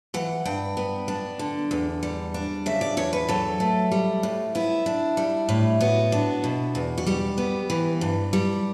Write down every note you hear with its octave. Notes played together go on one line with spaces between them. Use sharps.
E3 F#5
G2 G5
B3
D4
D3
E2
G3
D4
C#3 E5
D5
E2 C#5
B4
F#3 A4
A3
G3
A2
B3 E4
D4
G3
A2
B3 F#4
D4
B2
E2
F#4
G3 G4
B3
E3
G2
G3